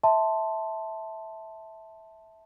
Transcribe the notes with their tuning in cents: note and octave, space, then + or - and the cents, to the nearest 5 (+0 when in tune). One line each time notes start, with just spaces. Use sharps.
E5 -15 A5 +0 C6 +0